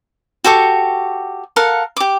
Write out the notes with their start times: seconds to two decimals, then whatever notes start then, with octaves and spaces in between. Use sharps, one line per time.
0.44 F#4 G4 A4 C#6
1.56 A4 A#4 F5 F#5
1.97 G4 D6